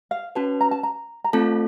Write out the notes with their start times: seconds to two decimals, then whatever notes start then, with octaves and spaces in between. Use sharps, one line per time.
0.11 F5
0.35 C#4 F#4 B4 A5
0.61 A#5
0.71 A5
0.83 A#5
1.24 A#5
1.33 A3 C4 F4 A4 A5